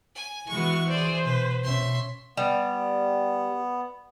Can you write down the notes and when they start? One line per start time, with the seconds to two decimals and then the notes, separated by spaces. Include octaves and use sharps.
0.15 G#5
0.49 E3 G#3 B3 F#4 C#6
0.90 G#4 C5 D5
1.24 B2 B4
1.63 B2 C#4 E5 C6
2.37 G3 B3